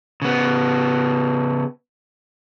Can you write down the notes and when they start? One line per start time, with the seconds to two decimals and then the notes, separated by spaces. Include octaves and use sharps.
0.22 C#3 B3